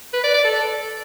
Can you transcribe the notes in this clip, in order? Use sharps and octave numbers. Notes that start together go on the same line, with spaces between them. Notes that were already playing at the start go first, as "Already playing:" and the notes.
B4
D5
D5
A4